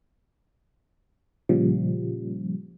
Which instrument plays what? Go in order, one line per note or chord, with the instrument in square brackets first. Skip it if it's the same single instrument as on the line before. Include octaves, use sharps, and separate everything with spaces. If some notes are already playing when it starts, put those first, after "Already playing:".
[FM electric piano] A#2 C#3 F3 G3